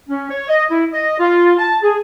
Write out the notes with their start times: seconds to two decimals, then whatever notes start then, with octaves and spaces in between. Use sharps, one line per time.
0.09 C#4
0.30 C#5
0.48 D#5
0.70 E4
0.92 D#5
1.19 F4
1.58 A5
1.83 G#4